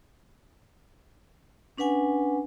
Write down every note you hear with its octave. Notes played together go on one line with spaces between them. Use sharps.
C#4 D4 B4 F#5 G#5